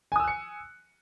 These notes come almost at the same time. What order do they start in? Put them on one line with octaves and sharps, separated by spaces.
G#5 D#6 E6 F#6 C#7